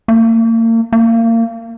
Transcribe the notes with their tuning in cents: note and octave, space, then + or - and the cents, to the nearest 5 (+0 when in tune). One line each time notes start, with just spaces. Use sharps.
A#3 -40
A#3 -30